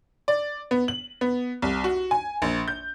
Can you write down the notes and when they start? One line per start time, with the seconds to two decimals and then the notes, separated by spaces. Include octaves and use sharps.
0.28 D5
0.71 B3
0.88 F#7
1.21 B3
1.62 C2
1.84 F#4
2.11 G#5
2.42 A#1
2.68 G6